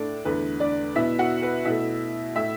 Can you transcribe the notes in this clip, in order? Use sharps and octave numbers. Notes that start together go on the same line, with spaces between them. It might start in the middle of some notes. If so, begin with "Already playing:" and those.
Already playing: A2 D4 A4 D5
E2 D3 A3 B4
D4 D5
B2 B3 E4 E5
F#4 F#5
B4
B2 A3 E4 E5
A2 A3 E4 E5